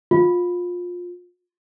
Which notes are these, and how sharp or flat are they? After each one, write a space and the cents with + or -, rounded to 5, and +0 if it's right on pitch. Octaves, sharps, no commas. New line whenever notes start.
F4 +20